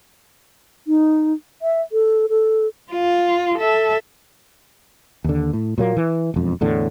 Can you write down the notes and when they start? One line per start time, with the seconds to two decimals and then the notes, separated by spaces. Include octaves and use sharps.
0.87 D#4
1.62 E5
1.92 A4
2.29 A4
2.92 F4
3.59 A4 E5
5.24 D#2 D3
5.53 A2
5.78 A#2 F#3 A#3
5.97 E3
6.34 E1 F2
6.61 E2 A2 D3